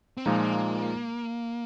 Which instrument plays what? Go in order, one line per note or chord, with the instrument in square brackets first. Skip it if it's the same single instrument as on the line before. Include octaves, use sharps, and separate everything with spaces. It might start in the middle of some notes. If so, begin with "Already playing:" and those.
[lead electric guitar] C4
[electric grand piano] A#2 F3 G#3 D#4 [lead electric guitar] A#3